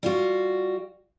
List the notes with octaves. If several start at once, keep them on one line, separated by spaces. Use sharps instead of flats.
G3 F4 F#4